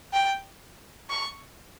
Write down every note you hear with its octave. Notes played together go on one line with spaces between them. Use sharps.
G5
C#6